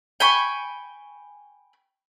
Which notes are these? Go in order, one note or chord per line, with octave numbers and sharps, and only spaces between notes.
G5 G#5 B5 C#6